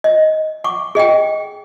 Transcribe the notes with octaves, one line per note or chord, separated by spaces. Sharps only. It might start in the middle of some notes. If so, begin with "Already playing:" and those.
D#5
F#5 C#6 D6
G#4 D#5 F#5 G5